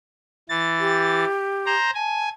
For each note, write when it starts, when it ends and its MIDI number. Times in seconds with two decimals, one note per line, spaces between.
0.49 1.25 52
0.49 1.25 93
0.79 1.74 67
1.66 1.90 72
1.66 1.90 82
1.94 2.29 80
1.94 2.26 81